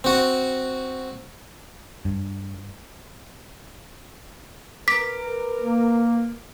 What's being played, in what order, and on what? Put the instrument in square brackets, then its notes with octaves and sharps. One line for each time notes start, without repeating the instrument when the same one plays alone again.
[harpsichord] C4 F#4
[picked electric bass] G2
[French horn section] A#4 B4 [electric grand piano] D6 [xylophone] B6
[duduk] A#3